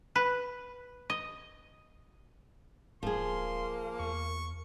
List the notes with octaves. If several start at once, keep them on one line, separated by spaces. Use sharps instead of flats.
B4
D#5
D1 F3 A#3 G#4 C6
E2 C#6